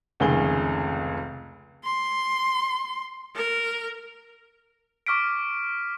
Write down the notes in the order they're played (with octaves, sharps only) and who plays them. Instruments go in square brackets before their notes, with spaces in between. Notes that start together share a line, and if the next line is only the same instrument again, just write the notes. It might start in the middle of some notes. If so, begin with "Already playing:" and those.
[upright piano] F1 C#2 D#3 G#4 G7
[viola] C6
A#4
[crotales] C#6 D6 F6 B6 D7